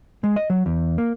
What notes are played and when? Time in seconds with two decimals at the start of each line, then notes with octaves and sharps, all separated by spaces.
0.24 G#3
0.36 D#5
0.50 F#3
0.66 E2
0.98 A#3